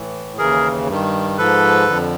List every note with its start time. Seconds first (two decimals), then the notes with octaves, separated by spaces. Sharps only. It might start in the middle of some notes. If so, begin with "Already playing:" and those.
Already playing: A2 E3
0.38 D#2 C#3 E3 G#4 A#4
0.88 G2 D#3
1.38 G#2 F3 A4 B4
1.88 F2 D3 F3